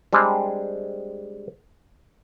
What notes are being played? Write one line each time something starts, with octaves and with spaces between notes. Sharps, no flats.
G3 G#3 C4 D4 G#4